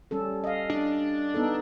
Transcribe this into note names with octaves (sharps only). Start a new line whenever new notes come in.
G3 C#4 A4
D#5 F5
D4
B3 D#4 A4